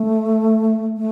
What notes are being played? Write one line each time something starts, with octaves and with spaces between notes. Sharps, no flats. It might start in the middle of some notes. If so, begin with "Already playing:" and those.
Already playing: A3
A3